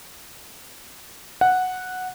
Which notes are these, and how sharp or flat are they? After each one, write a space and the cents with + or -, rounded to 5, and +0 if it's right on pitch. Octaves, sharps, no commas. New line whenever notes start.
F#5 -5